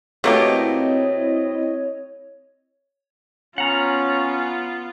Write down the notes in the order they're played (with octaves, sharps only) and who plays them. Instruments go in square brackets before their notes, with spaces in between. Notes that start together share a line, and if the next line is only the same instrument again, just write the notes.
[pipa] B2 A#3 G4 [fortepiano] A3 [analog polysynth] C4 E4 D#5 [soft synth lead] C#5
[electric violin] B3 F4 [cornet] C#4 [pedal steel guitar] F#5 A#5